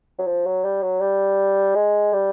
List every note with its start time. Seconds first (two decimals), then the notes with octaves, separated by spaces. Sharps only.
0.18 F#3
0.27 F3
0.46 F#3
0.64 G3
0.82 F#3
1.01 G3
1.75 G#3
2.13 G3